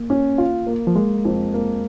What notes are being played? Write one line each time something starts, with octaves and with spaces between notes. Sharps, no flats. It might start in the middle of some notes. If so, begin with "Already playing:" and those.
Already playing: A#3
C#4
F4
A#3
F3
G#3 A#3
F2
A#3